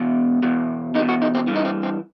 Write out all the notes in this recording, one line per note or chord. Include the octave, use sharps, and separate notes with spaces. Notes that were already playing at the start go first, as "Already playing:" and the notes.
Already playing: E2 B2
E2 B2
E2 D#4
B2
F#4
D#4
C4
G2 E3
D#4
C4
C4